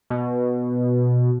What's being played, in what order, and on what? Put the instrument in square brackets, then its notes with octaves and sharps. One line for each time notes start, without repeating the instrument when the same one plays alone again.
[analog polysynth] B2